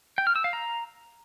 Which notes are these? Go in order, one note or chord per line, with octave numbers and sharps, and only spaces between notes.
G5
F6
E6
F5
A#5